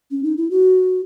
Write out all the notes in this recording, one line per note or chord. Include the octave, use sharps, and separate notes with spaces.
C#4
D#4
E4
F#4